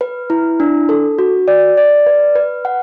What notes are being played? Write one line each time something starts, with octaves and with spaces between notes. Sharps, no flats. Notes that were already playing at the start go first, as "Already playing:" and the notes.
B4
E4
D4
A4
F#4
D5
D5
B4
B4
F#5